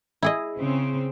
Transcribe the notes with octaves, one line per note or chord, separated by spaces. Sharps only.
E4 G#4 D#5
C#3 C4